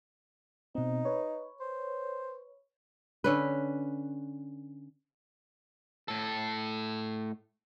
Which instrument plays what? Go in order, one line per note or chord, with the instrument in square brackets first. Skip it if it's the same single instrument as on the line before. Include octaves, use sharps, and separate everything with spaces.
[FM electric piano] B2 C4 [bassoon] D#4
[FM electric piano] B4 C#5
[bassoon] C5
[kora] D3 C#4 B4
[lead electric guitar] A2 A4